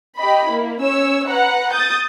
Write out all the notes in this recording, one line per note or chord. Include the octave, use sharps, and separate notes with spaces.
G4 D#5 B5
A#3 E4
C#4 C#5 E6
B4 F#5 A#5
D#6 G6 A6